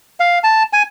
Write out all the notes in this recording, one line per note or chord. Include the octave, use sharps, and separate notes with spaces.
F5
A5
G#5